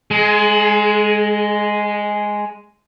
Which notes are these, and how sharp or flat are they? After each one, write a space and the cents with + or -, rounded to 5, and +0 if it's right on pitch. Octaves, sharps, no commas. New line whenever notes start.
G#3 +0 G#4 +40